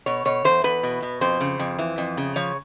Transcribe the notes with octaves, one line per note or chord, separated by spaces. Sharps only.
B2 C#5
B2 C#5
E2 C5
E2 B4
B2
B2
F2 C5
C#3
F2
E3
F2
C#3
F3 C#5